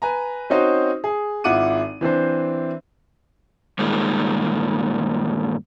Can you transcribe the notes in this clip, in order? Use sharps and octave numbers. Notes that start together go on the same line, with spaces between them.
B4 G#5 A#5
C4 C#4 D#4 F#4 C5
G#4
G#1 E4 F4 F#5 D6 D#7
E3 C4 D4 C5
G2 A#2 D#3 G#3